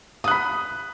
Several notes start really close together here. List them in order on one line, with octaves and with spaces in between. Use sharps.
D#6 F#6 B5